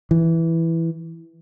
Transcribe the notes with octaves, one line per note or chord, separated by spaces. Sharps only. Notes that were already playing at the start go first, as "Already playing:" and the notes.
E3